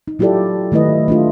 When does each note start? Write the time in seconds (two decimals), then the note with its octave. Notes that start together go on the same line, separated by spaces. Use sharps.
0.08 D#4
0.19 F#3 E4 F4 G4 A4 D5
0.72 D#3 A3 E4 B4 D#5
1.08 A3 D4 F4